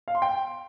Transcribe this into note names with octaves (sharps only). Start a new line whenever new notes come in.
F5
C6
G5